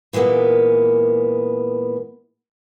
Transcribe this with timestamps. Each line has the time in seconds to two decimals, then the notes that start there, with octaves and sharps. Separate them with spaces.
0.13 A#2 E3 G#3 A#3 B3